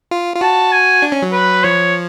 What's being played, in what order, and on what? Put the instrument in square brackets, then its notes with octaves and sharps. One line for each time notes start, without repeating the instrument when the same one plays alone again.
[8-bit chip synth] F4
F4
[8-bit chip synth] F#4 [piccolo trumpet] A5
[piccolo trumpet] G#5
[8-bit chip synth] D4
C#4
F#3
[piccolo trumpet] B4
[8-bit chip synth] F3 [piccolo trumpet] C#5